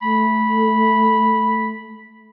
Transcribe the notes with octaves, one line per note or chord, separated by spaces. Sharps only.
A3 B5